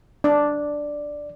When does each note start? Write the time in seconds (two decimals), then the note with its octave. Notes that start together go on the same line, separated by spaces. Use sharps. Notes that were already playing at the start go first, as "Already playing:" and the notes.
0.24 D4 D5